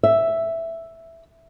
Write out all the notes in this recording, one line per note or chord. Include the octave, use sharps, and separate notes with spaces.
E5